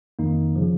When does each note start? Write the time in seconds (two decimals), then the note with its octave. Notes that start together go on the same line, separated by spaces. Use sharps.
0.19 F2 D#3 A#3 D#4
0.56 C#3 F3